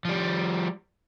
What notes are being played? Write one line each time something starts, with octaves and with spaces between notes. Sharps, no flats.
F3 G3